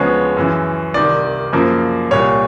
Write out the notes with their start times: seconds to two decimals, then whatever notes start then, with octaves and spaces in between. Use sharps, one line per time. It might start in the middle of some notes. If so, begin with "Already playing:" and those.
Already playing: D2 C#3 F3 G#3 B3 C#5
0.37 F#2 C#3 E3
0.94 C2 C3 D#3 D5
1.53 F#2 C#3 F3 A#3
2.11 C2 A#2 G3 C#5